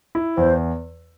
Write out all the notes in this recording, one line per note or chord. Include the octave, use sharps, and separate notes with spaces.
E4
E2 C5